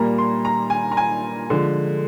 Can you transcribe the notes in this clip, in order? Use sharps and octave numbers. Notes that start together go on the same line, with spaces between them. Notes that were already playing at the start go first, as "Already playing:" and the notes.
Already playing: A#2 G3 A#3 A#5
C6
A#5
G#5
A#5
G#5
D3 F3 G#3